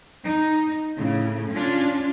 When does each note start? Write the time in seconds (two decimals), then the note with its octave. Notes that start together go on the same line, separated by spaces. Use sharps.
0.25 D#4
0.97 A2 C#3
1.52 C#4 D4 F4